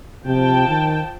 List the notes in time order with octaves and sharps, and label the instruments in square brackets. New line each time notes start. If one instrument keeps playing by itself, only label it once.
[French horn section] C3 [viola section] F3 G5 A5
[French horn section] D#3